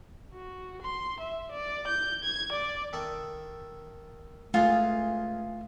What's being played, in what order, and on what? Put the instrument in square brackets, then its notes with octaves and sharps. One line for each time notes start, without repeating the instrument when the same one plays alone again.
[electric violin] F#4
C6
E5
D5
G6
G#6
D5
[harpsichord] D#3 A4 E5
[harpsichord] C#2 G#4 F#5 [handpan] A3 [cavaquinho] F4